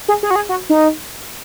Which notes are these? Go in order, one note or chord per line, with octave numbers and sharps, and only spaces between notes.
G#4
G#4
F#4
G#4
F#4
D#4